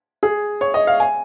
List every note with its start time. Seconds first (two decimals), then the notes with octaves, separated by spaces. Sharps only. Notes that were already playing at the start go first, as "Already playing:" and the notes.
0.23 G#4
0.61 C#5
0.74 D#5
0.87 F5
1.00 G#5